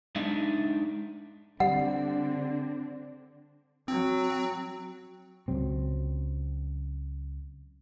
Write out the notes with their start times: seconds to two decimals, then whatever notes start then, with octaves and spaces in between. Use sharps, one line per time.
0.16 G#3 D4 D#4 D#5 E5
1.60 D3 G3 C4 D4 F#5
3.88 F#3 C4
5.48 C#2 F#3 C4